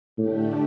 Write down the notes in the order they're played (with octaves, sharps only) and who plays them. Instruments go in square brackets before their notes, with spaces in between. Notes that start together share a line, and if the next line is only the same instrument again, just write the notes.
[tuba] A2 [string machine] D3 A3 D4 G4